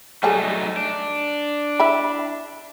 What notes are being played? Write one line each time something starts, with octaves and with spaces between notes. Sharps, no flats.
F#3 G3 A3 D#4 G#4 A4
D4
E4 E5 B5